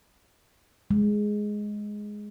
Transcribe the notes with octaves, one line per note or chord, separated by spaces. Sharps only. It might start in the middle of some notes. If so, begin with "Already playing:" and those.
G#3